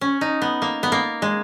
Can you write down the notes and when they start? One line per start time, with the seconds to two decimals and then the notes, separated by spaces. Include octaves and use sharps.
0.01 C#4
0.21 D#4
0.42 B3
0.62 A#3
0.83 B3
0.92 A#3
1.22 G#3